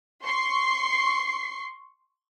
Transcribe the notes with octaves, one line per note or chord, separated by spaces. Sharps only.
C6 C#6 C7